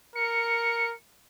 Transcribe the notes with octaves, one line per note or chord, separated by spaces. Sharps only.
A#4 C#7